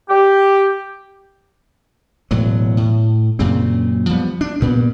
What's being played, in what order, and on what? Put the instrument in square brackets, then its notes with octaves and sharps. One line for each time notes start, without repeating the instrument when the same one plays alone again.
[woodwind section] G4
[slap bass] E1 A2 F#3
A2
F#2 A#2 C#3 C4
F3 G3 B3
D4
G2 A#2 B3